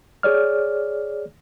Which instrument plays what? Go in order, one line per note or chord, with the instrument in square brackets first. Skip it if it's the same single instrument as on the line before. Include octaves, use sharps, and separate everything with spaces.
[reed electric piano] G#4 C#5 D5 F6